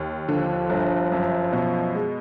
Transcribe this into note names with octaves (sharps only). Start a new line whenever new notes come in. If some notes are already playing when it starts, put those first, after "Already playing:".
Already playing: D#2
D3 F3
G1
F#2
B2
G#3